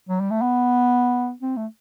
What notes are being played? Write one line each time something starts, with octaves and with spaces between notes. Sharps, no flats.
F#3
G3
A3
B3
C4
A3